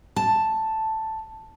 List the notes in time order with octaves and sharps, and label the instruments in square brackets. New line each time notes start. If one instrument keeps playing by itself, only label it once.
[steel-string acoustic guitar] A5